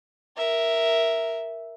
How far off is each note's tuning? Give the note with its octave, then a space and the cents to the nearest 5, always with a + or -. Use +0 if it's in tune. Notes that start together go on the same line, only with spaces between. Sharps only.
A#4 +0 E5 +0